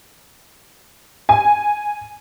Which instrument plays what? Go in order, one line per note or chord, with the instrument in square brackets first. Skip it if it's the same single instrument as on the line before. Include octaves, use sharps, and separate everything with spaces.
[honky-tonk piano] G#5